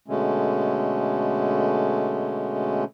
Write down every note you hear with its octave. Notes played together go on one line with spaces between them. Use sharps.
B2 D3 G#3 A3 C#4